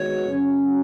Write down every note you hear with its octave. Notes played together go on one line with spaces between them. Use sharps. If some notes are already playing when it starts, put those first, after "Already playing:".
Already playing: D#3 G#3 B3 F#4 C#5
F#2 C#3 F#3 C#4 F#4